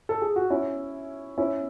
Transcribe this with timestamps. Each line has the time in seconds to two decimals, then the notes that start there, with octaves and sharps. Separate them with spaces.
0.09 A4
0.22 G#4
0.36 F#4
0.50 C#4 E4
1.38 C#4 E4